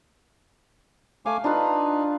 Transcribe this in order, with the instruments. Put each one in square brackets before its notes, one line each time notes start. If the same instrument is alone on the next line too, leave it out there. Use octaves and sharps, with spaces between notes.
[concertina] A3 G#5 D6 [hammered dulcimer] F5
[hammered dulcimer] D4 F4 B4 [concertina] D#4